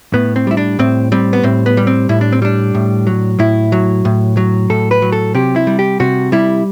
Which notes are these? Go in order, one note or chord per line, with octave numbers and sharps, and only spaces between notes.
A2 B3
C4
G3 E4
D4
A2 C4
G3 C4
B3
A2 C4
B3
G3
C4
A2 E4
D4
C4
G3 D4
A2
F#3
A2 E4
F#3
A2
F#3
A2 A4
B4
F#3
A4
C3 G4
E4
G3
G4
C3 F#4
G3 E4